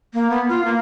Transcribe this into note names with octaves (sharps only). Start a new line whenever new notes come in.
A#3
B3
F4
A#3